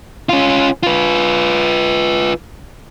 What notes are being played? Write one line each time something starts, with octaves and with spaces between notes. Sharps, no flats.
C#4 F4
F4 B4